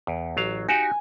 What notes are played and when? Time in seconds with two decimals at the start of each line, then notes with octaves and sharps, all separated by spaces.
0.07 E2
0.37 A1 F#3 F5
0.69 D#4 F#4 G4 G#5